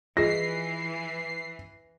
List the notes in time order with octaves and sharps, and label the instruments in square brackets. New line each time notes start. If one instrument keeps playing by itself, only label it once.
[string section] E3 [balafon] F4 G#4 D#5 [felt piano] A#6 [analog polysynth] C7